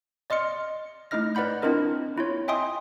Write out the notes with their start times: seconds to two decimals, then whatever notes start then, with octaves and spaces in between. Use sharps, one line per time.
0.30 D5 D#5 C6 F6 C#7
1.11 A3 D#4 E4 D#5 F6 A#6
1.35 B4 D5 F#5 B5 G6
1.62 C4 D4 E4 F4 A#4 D#5
2.16 C4 E4 F4 C#5
2.48 D#5 E5 G5 G#5 C6 D#6